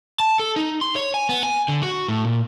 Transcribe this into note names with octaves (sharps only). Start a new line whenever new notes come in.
A5
A4
D#4
C6
C#5
G#5
B3
G#5
D3
F#4
A2
A#2